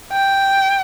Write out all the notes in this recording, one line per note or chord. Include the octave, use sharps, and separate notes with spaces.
G5